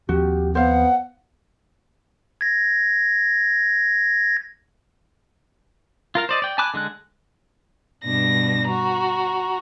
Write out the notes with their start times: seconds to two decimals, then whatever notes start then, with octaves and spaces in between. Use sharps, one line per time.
0.09 D#2 F3 C4 F#4 G4
0.55 B3 C5 F5 F#5
2.41 G#6 A#6
6.15 F4 A#4 F5
6.29 C5 D5 D#5
6.42 D5 G5
6.58 G#5 A5 B5 D6 F#6
6.74 D3 G#3 D4 F#6
8.04 G2 B2 D4 A#6
8.68 F#4 A#5